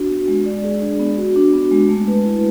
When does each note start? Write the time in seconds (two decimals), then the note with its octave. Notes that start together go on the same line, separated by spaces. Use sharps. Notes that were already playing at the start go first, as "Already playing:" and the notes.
Already playing: D4 F#4
0.09 B3
0.28 G#3
0.46 D5
0.64 G#4
0.82 D4
0.99 B3
1.18 F#4
1.36 D4
1.54 B3
1.71 G#3
1.89 A3
2.07 B4
2.25 E4